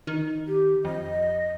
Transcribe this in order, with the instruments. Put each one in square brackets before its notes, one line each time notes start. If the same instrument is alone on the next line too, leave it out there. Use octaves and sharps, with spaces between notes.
[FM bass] D#3
[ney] G4
[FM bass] F2 [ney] D#5